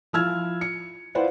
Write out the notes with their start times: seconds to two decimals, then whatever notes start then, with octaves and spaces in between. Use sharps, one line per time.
0.13 F3 E4 E6 F6 G#6
0.61 C#7
1.15 E4 F4 B4 C5 D5 F#5